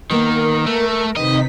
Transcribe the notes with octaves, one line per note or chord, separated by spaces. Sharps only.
D#3 A#3 B3 A#4 D#5
A3
C3 D#3 D#4 B4 C5 D#5 B6